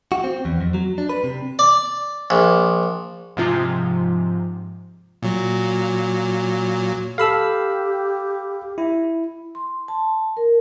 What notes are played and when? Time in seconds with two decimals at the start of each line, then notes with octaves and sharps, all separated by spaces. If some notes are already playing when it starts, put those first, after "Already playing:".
0.12 F#4
0.24 C4
0.45 E2
0.61 F2
0.74 F#3
0.98 D4
1.09 B4
1.24 C3
1.59 D5
2.30 A#1
3.37 G#2 C3 F3 G#3 F4
5.22 A#2 F#3
7.18 G4 A4 F5 A5 B5 E6
8.78 E4
9.55 C6
9.88 A5
10.37 A#4